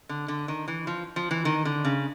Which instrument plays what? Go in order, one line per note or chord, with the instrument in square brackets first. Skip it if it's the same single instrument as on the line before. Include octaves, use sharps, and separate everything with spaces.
[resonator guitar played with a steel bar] D3
D3
D#3
E3
F3
F3
E3
D#3
D3
C#3